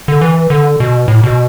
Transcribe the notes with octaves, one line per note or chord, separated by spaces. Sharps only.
D3
E3
D3
B2
A2
B2